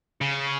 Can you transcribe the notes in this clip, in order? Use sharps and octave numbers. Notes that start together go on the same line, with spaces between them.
C#3